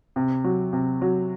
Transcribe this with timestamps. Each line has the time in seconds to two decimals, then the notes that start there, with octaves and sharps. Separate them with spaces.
0.16 C3
0.44 F#3
0.73 C3
1.02 F#3